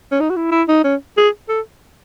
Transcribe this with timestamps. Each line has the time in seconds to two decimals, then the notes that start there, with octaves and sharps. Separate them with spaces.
0.12 C#4
0.20 D#4
0.30 F#4
0.36 E4
0.52 E4
0.68 D#4
0.84 C#4
1.17 G#4
1.49 A4